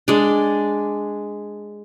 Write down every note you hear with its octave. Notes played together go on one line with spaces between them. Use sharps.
G#3 D4